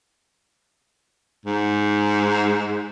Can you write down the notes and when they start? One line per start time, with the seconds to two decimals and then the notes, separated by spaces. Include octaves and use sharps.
1.45 G#2